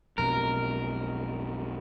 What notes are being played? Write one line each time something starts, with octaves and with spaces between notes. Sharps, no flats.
B1 F2 B2 A#4